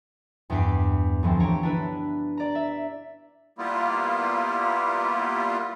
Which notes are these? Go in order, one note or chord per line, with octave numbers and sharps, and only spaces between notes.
E2 G2 B3 G4 D6 C7
D2 E3 F3 C4
G4 C#5 A#5
D4 E4 B4
D5 A#5
E5
G3 A#3 B3 E4 F4